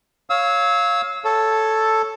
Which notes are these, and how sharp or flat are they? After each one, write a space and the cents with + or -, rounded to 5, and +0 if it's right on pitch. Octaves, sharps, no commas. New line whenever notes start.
C#5 +0 F5 +0 E6 -25
A4 +0 C#5 +0